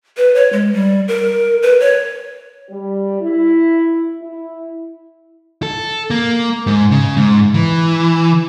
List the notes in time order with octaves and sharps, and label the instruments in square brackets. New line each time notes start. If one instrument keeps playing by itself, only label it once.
[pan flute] B4
C#5
G#3
G3
A#4
B4
C#5
[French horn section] G3
E4
E4
[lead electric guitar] A4
A#3
G#2
C#3
G#2
E3